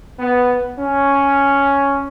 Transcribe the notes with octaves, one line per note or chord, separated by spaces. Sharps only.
B3
C#4